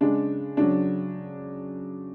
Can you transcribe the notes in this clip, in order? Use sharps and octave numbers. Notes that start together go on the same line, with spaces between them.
C#3 G#3 D4
C#3 F#3 D4